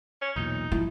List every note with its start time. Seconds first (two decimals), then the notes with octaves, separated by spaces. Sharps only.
0.22 C#4
0.36 B1 E2 A#2 D#4
0.72 G#1 F3 E4